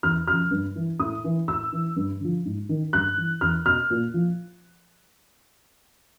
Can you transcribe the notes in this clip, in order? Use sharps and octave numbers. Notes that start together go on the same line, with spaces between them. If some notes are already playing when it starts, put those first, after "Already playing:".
E2 F6
C#3 F3 F6
G2
E3
A2 D#6
E3
A2 E6
E3
G2
D3 F3
G#2
D#3
G2 F#6
E3
E2 F6
B2 F6
A#2
F3